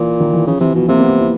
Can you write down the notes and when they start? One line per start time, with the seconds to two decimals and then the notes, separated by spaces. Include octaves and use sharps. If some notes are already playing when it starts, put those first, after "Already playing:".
Already playing: A#2 E3
0.20 D#3
0.33 E3
0.46 C#3 F3
0.61 C3 E3
0.75 B2 F3
0.88 C3 A#3
1.00 B3
1.10 C4
1.20 E4